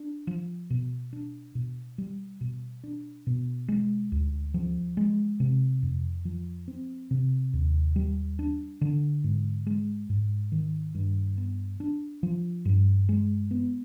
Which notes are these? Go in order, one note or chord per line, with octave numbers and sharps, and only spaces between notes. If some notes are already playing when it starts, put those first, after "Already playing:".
Already playing: D4
F3
B2
D4
B2
G3
B2
D4
B2
G#3
D2
F3
G#3
C3
F2
F3
C4
C3
D#2
G3
D4
D3
G#2
G#3
G#2
D#3
G2
B3
D4
F3
G2
G#3
B3